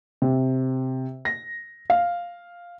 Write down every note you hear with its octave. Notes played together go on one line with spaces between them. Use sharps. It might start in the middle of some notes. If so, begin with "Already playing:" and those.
C3
A#6
F5